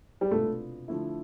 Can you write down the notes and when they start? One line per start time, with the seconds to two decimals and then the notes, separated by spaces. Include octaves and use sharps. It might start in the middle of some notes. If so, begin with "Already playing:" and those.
0.21 G3
0.31 C2 B2 A3 B3 D4 F4
0.88 D3 F3 A3 E4